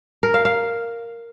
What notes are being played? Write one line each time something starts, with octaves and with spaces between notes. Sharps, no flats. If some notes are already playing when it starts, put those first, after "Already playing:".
A#4
F5
F5